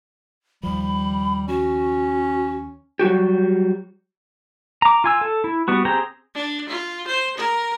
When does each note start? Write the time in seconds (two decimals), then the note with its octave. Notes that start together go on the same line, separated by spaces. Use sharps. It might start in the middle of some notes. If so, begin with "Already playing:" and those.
0.63 D#2 F3 G3 B5
1.48 C#4 F#4
2.99 F#3 G3 F#4 G4
4.82 A#5 D6
5.04 F4 G#5 E6
5.21 A4
5.44 E4
5.68 G3 B3 F#4
5.85 C4 G4 G#4 G5 A#5
6.35 D4
6.69 F4
7.07 C5
7.37 A#4